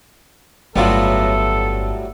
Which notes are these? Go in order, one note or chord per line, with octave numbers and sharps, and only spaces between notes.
G1 A2 F#3 G3 B3 F4 F#4 A4